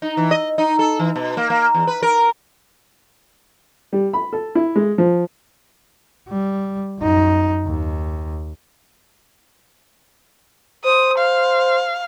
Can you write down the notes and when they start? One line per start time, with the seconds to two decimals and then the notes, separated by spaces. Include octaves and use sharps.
0.02 D#4
0.17 E3
0.31 D#5
0.58 D#4
0.79 A4
0.99 E3
1.16 B2
1.37 A#3
1.50 A#3
1.74 E2
1.87 B4
2.02 A#4
3.93 G3
4.13 B5
4.33 A4
4.55 E4
4.76 G#3
4.98 F3
6.28 G3
6.99 F#2 D#4
7.66 D#2
10.84 C5 D#6
11.18 F5